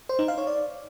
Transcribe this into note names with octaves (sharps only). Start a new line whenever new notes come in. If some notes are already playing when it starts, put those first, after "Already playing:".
C5
D#4
F5
C#5
D5